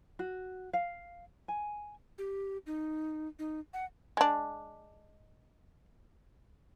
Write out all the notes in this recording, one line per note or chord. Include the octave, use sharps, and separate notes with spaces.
F#4
F5
G#5
G4
D#4
D#4
F#5
G#3 D4